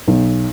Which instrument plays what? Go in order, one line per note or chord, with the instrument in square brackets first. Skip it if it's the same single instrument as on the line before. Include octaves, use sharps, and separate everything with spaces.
[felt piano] B1